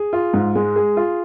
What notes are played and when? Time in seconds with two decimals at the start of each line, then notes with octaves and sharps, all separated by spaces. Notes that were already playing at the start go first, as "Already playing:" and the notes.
Already playing: G#4
0.13 F4
0.34 G#2
0.55 G#3
0.76 G#4
0.97 F4